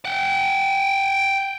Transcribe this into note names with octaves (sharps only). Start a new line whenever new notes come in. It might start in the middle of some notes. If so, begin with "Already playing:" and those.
F#5 G5